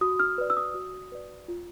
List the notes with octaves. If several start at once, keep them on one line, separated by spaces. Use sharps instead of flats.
F#4 D#6
F6
B4 D5
E6
D#6
F#4
B4 D5
F4